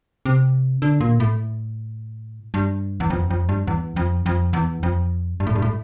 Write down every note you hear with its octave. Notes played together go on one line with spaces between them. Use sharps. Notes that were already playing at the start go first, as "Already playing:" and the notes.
C3
D3
A#2
A2
G2
E2
F2
F2
G2
E2
F2
F2
E2
F2
G2
A2
G2
A2